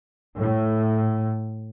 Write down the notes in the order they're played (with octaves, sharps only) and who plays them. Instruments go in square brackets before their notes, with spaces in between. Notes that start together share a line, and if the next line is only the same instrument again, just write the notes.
[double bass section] A2